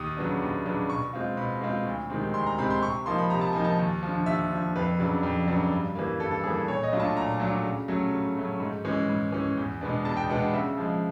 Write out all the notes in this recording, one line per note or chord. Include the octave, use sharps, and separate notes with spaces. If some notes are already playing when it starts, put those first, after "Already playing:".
Already playing: D#2 D#6
C#3 F#3 B3 D4
D#2
C#3 F#3 B3 D4
B2 C#6
G#3 C4 F4
B2 B5
G#3 C4 F4
D2
C3 D#3 G#3 C4
D2 C6
A#5
C3 D#3 G#3 C4 B5
C6
C3 C#6
F3 A#3 D#4 C6
B5
C3 A#5
A5
F3 A#3 D#4 G#5
A5
D#2
F3
D3
D#2 E5
D3 F3
F2 B4
C#3 F#3 B3 D4
F2
C#3 F#3 B3 D4
G2
E3 G3 A#3
G2 A4
A4
E3 G3 A#3 G#4
A4
A#2 C#5
D#5
F#3 A3 D4 F4
A5
A#2 A#5
F#3 A3 D4 F4
C#3
F#3 A3 C#4
C#3
F#3 A3 C#4
G#2
E3 G#3 C#4
G#2
E3 G#3 C#4
E2
B2 G#3 B3 D4
E2 A5
G5
B2 G#3 B3 D4 F#5
C#3 E5
F3 G#3